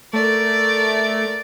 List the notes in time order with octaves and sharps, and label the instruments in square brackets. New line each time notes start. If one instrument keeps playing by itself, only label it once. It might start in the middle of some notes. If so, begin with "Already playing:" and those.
[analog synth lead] A3 [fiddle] A#4 D5